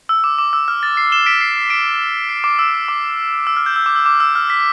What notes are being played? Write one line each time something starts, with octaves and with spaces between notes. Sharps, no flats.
E6
D6
D6
E6
F6
A6
C7
E7 G7
B6 D7
C7
C7
B6 D7
C7
D6
E6
D6
E6
F6
G6
E6
D6
E6
D6
E6
F6
B6